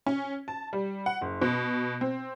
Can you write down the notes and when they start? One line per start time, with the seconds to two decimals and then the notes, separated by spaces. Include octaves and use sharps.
0.06 C#4
0.48 A5
0.73 G3
1.06 F#5
1.21 F#1
1.42 B2
2.01 C4